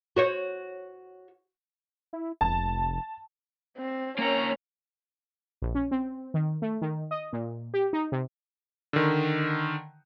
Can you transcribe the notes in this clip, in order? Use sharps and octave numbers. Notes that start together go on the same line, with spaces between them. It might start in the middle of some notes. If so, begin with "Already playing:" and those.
F#4 C5 C#5
E4
F1 A5
C4
A#3 C#4 A#4 C#5 A#5
A#1
C#4
C4
D#3
A3
D#3
D#5
A#2
G4
D#4
C3
D3 D#3